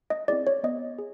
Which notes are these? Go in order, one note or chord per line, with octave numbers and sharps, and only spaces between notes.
D#5
C4 E4 G#4 D5
C#5
B3 D#5
G#4